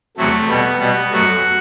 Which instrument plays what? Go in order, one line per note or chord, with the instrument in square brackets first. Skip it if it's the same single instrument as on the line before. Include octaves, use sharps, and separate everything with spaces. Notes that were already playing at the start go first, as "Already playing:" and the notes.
[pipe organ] E2 C3 F#3 A3
B2 G3 B3
B2 G3 B3
F#2 F#3 A3 F#4